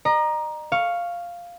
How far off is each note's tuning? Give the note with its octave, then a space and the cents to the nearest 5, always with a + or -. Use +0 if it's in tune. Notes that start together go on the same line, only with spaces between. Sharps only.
D#5 -40 A#5 +15
F5 +0 C#6 +0